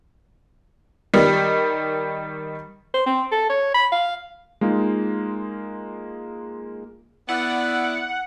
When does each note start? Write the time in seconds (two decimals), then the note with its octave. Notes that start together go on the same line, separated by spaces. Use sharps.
1.14 D#3 G3
2.94 C5
3.06 C4
3.31 A4
3.49 C#5
3.74 B5
3.92 F5
4.61 G#3 A#3 D#4 F4
7.29 B3 E4 D5 F#5